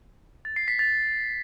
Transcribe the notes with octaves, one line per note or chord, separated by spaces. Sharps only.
A6
C7
B6
A6